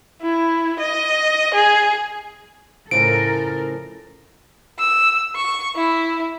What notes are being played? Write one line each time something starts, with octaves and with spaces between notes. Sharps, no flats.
E4
D#5
G#4
A2 C#3 F3 A4 A#4 D7
E6
C#6
E4